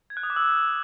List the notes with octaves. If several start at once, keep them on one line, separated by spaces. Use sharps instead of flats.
G#6
F#6
D#6
D6
E6